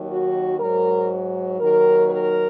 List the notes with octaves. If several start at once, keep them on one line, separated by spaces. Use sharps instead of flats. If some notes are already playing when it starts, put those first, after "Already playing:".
Already playing: D#2 D#3 F#3
F#4
G#2 F#3 A#4
D#2 D#3 F#3 A#4
A#4